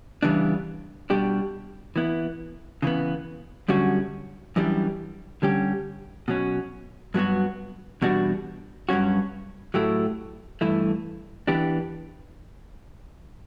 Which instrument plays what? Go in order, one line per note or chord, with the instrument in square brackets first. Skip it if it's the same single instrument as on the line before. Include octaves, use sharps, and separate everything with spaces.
[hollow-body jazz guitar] C#3 E3 G3 B3 D4
B2 G3 D4 G4
E3 B3 E4
C#3 E3 B3
F#2 D3 G3 C#4 F#4
F#2 E3 G3 D4
D3 G3 C#4 G4
B2 F#3 C#4
G2 F#3 B3 F#4
E2 B2 G3 D4 F#4
G2 F#3 C#4 F#4
A2 F#3 A3 E4 G4
G2 E3 A3 E4
E3 B3 D4 G4